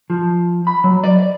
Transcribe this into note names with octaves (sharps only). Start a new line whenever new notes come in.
F3
B5
F#3
D5
D5